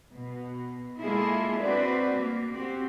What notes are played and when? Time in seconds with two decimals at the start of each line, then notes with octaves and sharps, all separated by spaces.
0.12 B2
1.00 G#3 A#3 E4 F4 G#4 A4
1.57 C4 D4 F#4 B4 D5
2.15 A#3
2.50 C4 F#4 G4